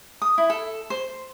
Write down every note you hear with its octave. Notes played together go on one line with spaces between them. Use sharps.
D#6
E4
A4
C5